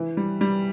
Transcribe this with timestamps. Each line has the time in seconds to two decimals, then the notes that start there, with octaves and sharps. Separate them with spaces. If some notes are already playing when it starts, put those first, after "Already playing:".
Already playing: E3
0.17 G3
0.41 G3